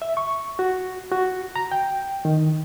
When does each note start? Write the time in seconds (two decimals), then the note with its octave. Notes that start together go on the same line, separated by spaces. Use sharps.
0.02 E5
0.17 C#6
0.59 F#4
1.12 F#4
1.56 A#5
1.72 G5
2.25 D#3